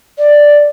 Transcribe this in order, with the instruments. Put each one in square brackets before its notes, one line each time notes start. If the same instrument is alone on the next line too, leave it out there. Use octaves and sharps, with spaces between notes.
[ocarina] D5